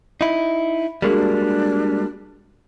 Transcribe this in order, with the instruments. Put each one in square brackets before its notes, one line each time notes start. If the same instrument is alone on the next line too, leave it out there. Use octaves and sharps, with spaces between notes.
[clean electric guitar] D#4 E4
[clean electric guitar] G3 G#3 A#3 [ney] D4 [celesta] F#4 G#4 A#4